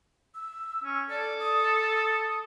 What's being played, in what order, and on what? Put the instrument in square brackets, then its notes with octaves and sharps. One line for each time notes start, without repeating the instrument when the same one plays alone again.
[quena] E6
[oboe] C#4
[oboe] A4 [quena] D5
[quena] D#6